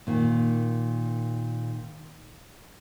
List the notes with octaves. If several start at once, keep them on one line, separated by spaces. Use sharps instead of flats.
A#2 D#3